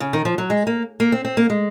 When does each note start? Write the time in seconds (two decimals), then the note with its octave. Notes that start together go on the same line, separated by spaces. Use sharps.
0.00 C#3
0.13 D#3
0.25 F3
0.38 F#3
0.50 G#3
0.67 A#3
1.00 A#3
1.12 C4
1.25 C4
1.37 A#3
1.50 G#3